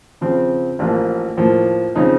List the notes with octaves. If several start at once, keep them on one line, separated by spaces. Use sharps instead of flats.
C#3 F3 C4
A1 A2 F3 A#3
A2 F3 A#3
C#3 F3 C4 D#4